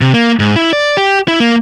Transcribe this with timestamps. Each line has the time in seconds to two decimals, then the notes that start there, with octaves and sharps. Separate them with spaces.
0.01 C3
0.14 A#3
0.39 G#2
0.56 E4
0.73 D5
0.97 G4
1.28 E4
1.40 A#3